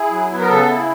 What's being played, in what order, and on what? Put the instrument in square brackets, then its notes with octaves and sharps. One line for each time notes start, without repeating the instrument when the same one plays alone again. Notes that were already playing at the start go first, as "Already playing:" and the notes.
Already playing: [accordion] E4 G#4
F#3
B3
A#4
C#3 A4
E4